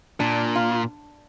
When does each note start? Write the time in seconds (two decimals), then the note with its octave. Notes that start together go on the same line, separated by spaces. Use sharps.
0.20 A#2 D4
0.55 F4